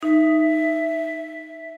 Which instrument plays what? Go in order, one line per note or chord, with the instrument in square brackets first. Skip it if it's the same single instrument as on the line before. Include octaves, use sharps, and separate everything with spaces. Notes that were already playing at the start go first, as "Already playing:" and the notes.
[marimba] D#4 [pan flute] E5